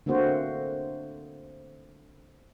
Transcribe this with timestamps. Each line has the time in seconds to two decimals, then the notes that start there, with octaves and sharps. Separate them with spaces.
0.06 D3 A3 A#3 C4 F#4 C5